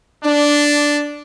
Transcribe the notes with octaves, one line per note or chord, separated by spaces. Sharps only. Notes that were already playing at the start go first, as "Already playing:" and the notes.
D4